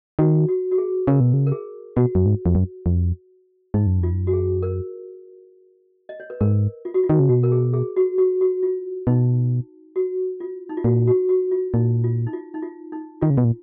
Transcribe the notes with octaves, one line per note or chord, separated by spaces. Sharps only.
D#3 F#4
F#4
F#4
G#4
C#3 A#4
B2
C#3
A#4
G#4
B2 F#4
F#2
G#2
F2
F#2
F2
G#2 D#4
F#2
F2 F4
F#2
F#4
G#4
A#4
D#5
C#5
B4
G#2 A#4
F4
F#4
F4
D#3
C#3
B2 F#4
A#4
G#4
G#4
F#4
F#4
F#4
F4
B2 D#4
F#4
F4
D#4
F4
A#2 F#4
F#4
F#4
F4
A#2 D#4
F4
D#4
F4
D#4
F4
D#4
D#3 F4
C#3
B2
A#2